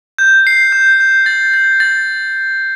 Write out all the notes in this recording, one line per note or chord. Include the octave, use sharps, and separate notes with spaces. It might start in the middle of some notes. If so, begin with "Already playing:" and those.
G6
C7
G6
G6
A6
A6
A6